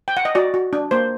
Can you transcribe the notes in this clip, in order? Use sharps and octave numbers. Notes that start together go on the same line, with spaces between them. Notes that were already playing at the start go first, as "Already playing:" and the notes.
G5
F#5
D#5
F#4 D5
F#4
D4
A#3 C5